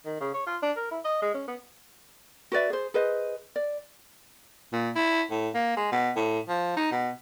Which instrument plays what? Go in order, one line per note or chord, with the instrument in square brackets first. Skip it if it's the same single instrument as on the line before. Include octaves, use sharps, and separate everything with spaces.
[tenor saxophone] D#3
C#3
C#5
F4
D4
A#4
E4
D#5
G#3
C#4
B3
[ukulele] F#4 B4 D5 E5
G#4 C5
G#4 B4 C5 D#5
D5
[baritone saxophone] A#2
E4
A2
A#3
G#3
B2
A2
F3
D#4
B2